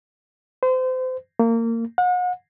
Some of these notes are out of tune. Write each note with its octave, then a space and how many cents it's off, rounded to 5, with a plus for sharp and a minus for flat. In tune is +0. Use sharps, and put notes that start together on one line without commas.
C5 -30
A#3 -25
F#5 -40